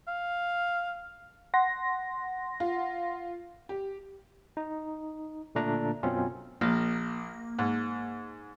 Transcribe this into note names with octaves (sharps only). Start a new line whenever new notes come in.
F5
F#5 C6 A#6
F4
G4
D#4
A#2 D3 A3 D4 A#5
F#2 B2 C4 C#4 F4
A#1 A#3
G#2